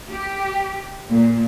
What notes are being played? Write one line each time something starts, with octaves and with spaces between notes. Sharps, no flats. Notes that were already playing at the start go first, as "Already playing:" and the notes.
G4
A#2